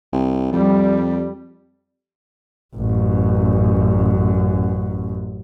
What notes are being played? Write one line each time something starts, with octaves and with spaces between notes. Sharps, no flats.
C2
F2 G3
A1 F#2